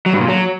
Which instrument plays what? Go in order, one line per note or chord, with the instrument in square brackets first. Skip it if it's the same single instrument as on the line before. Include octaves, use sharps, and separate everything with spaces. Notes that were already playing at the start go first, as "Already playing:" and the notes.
[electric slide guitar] F#3
G2
A#2
F#3